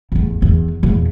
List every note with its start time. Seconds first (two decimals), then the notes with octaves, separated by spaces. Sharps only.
0.12 A1 E2
0.42 E2
0.83 E2 A#2